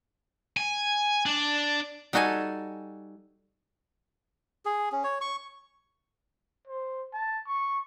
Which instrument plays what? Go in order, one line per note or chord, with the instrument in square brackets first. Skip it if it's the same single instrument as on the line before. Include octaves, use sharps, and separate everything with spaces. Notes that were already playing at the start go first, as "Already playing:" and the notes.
[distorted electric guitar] G#5
D4
[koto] G3 D#4 F#4 A4 G#5 A5
[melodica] G#4
C#4
C#5
C#6
[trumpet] C5
A5
C#6